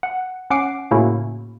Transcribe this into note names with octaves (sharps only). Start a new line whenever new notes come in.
F#5
C#4 F#5 D6 C7 D7
A2 C#3 A#3 C#4 E4 F#4